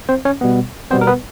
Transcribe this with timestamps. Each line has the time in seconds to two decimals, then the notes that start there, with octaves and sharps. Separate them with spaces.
0.09 C4 C5
0.25 C#4 C#5
0.41 B2 G3 B3
0.91 B2 G3 B3 C4 C5
1.01 A#4
1.07 B3 B4